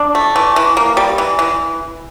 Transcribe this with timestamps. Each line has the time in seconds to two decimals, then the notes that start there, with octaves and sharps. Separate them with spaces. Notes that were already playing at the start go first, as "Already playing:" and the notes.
Already playing: D4
0.15 A3
0.36 E3
0.56 E3
0.77 A#3
0.97 G3
1.18 E3
1.39 E3